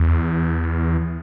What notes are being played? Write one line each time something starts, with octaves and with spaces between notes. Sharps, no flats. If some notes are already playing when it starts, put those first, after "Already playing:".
Already playing: E2